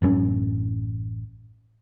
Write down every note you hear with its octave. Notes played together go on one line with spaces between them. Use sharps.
A1 F#2 B3 C#4